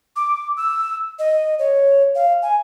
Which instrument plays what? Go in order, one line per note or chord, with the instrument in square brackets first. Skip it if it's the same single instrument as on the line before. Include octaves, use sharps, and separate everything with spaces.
[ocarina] D6
E6
D#5
C#5
F5
G#5